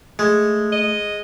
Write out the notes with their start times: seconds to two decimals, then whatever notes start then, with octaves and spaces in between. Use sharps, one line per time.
0.19 G#3 A3
0.72 D#5